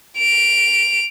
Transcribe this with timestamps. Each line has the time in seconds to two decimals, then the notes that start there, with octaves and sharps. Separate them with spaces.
0.18 D7 F7